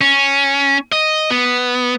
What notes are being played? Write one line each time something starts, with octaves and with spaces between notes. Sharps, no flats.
C#4
D#5
B3